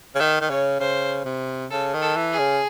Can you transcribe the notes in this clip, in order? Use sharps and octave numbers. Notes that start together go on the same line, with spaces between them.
C#3
D#3 E5
D#3
C#3 C#5
C#3 C5
C3
C#3 A4
D#3
A4
E3
G#4
C#3